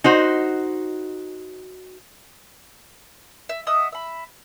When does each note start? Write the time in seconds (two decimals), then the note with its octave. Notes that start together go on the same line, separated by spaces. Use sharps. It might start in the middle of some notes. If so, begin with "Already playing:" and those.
0.04 D#4 F#4 C5
3.49 E5
3.67 D#5 E5 F#5 D#6
3.92 E5 B5